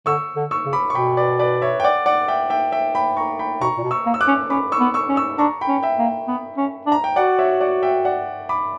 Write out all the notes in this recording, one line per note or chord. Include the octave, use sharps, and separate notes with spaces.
D3 C#6 E6
D3
C#6 E6
C#3
B5 D6
C#6
B2 G5 B5
B4 D5
B4 D5
C#5 E5
G5
D5 F#5
D5 F#5
E5 G5
E5 G5
E5 G5
G5 B5
A#5 C#6
G5 B5
B2 A#5 C#6
A#2
B2
C#6 E6
A#3
E6
D6 F#6
C#4
C#4 B5 D6
C#6 E6
B3
C#6 E6
C#4
C#6 E6
D4 A#5 C#6
G5 B5
C#4
E5 G5
A#3
B3
C#4
D4
A#5
G5
F#4 D5 F#5
C#5 E5
D5 F#5
E5 G5
D5 F#5
B5 D6